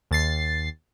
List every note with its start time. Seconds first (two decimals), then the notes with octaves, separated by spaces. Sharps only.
0.11 D#2 A6 C7